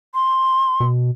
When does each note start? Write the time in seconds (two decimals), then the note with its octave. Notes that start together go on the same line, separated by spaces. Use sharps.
0.14 C6
0.80 B2